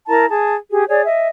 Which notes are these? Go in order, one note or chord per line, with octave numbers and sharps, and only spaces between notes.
E4 A#4 A5 A#5
G#4 A5
G4 G#4
G#4 C#5 D5
D#5 E5